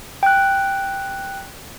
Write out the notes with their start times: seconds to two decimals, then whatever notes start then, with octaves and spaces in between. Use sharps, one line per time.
0.23 G5 F#6